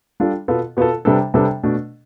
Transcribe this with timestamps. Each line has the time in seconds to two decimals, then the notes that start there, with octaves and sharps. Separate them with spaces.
0.20 G3 D4 F4 A4
0.48 B2 B3 F4 A4
0.77 B2 B3 F4 A4
1.05 C3 G3 B3 D4 A4
1.34 C3 G3 B3 D4 A4
1.63 B2 A3 D4